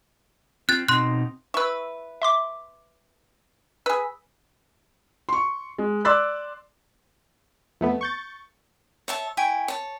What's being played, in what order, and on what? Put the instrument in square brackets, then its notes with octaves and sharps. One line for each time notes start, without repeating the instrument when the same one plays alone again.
[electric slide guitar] C4 F4 [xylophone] F#6 A6
[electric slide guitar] B2 C4 D#4 [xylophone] C6 F#6
[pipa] E4 B4 [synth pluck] C#6 E6
[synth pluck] E5 C6 D6
[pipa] G#4 B4 [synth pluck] E6
[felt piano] C6 C#6
G#3
D5 C6 D6 E6 F#6 A6
[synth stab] F2 A3 B3
C#6 G6 A6
[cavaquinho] C#5 E5 A5
E4 G5 G#5 C#6
C#5 A5